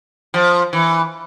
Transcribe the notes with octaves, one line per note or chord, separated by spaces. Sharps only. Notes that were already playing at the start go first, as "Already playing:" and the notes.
F3
E3